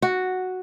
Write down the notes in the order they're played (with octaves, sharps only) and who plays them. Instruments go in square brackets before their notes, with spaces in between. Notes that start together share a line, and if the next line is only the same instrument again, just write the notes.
[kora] F#4